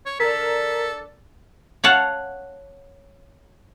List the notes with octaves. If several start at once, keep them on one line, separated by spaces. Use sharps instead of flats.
C#5
D3 A4 A#4 B6
C#5 F5 F#5 A5